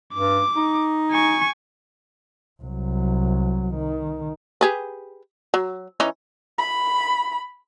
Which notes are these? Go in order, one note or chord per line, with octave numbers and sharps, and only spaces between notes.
G2 D6
D#4
G#5 C#6
C2 F#3
D#3
G4 G#4 B4
F#3
E3 C#4 D#4
B5